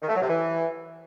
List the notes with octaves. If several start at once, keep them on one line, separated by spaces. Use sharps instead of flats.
D#3
A3
F#3
C3
E3